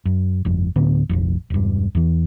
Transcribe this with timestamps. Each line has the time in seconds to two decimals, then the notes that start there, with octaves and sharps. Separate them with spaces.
0.05 F#2
0.45 G1 F2
0.76 D2 A2 D3 B3
1.09 F1 A#1 F2
1.50 E1 G2
1.95 E2 E3